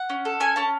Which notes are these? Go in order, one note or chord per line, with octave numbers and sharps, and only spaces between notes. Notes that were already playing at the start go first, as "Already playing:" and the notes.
Already playing: F#5
C#4
A4
C#4 G#5
C#4 A5